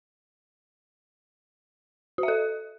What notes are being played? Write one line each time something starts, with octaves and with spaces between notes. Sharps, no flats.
F#4
E5
A4